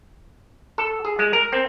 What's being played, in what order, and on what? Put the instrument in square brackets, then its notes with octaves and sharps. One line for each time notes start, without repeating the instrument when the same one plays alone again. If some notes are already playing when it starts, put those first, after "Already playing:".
[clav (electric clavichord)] A4
G#4
G#3
A#4
C4